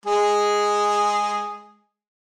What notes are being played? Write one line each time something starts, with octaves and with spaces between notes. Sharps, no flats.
G#3 G#4